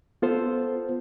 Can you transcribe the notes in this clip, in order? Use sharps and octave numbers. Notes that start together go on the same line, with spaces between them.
B3 F4 A4 C5